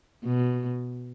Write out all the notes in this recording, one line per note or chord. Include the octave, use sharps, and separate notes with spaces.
B2